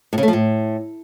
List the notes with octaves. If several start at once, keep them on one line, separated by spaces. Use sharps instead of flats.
A2
C#3
A3
F3
A2